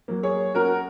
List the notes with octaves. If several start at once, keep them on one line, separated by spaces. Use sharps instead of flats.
F#3 A#3
G#4 C#5
F#2 F#4 A#4